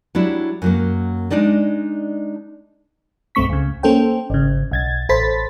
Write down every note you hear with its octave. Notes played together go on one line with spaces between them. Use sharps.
F#3 G3 D4 E4
F#2 F#3 A#3
G#3 D4 D#4 D5 D#5
B1 G2 A3 C4 C#6 B6
C#2 C#3
A#3 C#4 A4 C5 G5
G#1 C#3
B1 G#6 A6
A1 A4 C5 B5 A6 B6